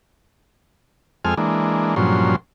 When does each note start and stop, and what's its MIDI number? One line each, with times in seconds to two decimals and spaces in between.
1.25 1.34 41
1.25 1.34 56
1.25 1.34 60
1.25 1.34 69
1.25 1.34 80
1.25 1.34 89
1.37 1.95 52
1.37 1.95 56
1.37 1.95 58
1.37 1.95 62
1.96 2.36 43
1.96 2.36 46
1.96 2.36 53
1.96 2.36 54
1.96 2.36 61
1.96 2.36 84